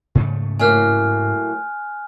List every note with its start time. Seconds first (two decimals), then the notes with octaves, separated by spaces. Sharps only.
0.15 G#2 C#3 A3
0.59 A2 F#3 A#3 G#5 F6 F#6